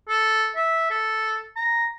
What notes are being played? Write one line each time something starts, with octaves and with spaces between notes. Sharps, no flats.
A4
E5
A4
A#5